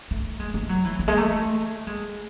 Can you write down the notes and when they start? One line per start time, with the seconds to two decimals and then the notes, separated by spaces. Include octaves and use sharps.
0.11 A3
0.40 G#3
0.54 A3
0.69 F#3
0.84 E3
0.99 E3
1.08 G#3
1.18 A3
1.87 G#3